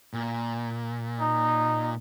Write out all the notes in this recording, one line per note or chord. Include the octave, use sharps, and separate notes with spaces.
A#2
D#4